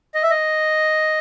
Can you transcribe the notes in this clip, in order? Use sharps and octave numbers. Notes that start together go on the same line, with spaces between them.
D#5
E5
D#5